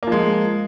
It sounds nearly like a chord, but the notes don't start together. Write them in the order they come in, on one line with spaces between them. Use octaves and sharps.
A#3 F3 G#3